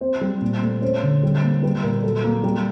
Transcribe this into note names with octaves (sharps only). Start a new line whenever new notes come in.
C4 C5
G3
A#2
A3
C#4 C5
D3
G3
A#3
G3 B4
A#2 A#4
F#3 A4
A#3
G3